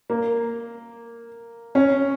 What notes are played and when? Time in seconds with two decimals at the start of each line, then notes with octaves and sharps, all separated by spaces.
0.10 A#3
1.75 C#4